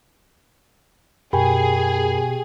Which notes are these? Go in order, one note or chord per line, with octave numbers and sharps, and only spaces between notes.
F#2 B2 G4 G#4 A#4 G5 G#5 B5